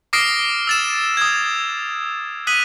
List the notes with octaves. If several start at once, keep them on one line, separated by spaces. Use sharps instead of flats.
D6 D#6 F6 A#6 C7 D7
E6 A6 E7
D#6 G#6
D#6 F#6 B6 D#7 F#7